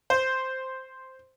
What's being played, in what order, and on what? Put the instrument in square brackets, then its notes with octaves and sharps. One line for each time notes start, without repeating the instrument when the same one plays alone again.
[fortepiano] C5